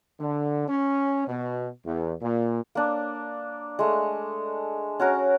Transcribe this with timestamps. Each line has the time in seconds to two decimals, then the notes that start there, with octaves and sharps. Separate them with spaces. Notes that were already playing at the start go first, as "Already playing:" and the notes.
0.20 D3
0.69 C#4
1.27 B2
1.85 E2
2.22 A#2
2.75 A#3 D4
3.79 G#3 A3
5.00 C#4 F#4 A#4